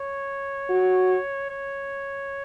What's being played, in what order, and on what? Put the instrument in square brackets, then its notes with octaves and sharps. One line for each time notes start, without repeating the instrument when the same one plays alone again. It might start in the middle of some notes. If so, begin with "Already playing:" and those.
Already playing: [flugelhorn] C#5
[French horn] F#4
[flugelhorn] C#5